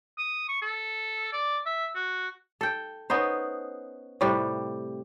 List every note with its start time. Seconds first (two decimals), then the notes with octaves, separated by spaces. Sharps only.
0.18 D#6
0.49 C#6
0.62 A4
1.33 D5
1.66 E5
1.96 F#4
2.61 A4 G5
3.10 B3 C#4 D#4 C5
4.21 A2 C3 G3